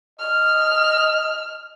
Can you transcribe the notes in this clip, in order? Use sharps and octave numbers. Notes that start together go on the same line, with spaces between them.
D#5 F6